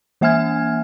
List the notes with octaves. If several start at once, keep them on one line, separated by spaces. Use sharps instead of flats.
E3 A#3 E5 G#5 F6 G#6